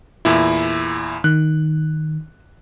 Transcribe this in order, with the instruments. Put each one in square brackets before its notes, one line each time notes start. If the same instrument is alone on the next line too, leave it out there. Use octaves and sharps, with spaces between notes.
[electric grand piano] E2 A#2 E4
[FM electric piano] D#3 [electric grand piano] F#6